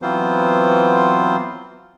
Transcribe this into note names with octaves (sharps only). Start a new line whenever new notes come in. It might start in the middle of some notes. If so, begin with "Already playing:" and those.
E3 F#3 B3 C4 F4 C5